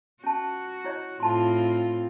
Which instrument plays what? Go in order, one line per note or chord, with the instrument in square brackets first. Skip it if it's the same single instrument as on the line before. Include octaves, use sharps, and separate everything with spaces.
[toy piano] C#4 A5 [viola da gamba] F#4
[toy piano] E4 C#5 D#5
[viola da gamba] A2 C4 F4 [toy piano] A5 C6